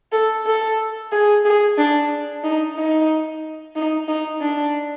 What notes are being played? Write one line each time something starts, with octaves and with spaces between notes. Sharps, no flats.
A4
A4
G#4
G#4
D4
D#4
D#4
D#4
D#4
D4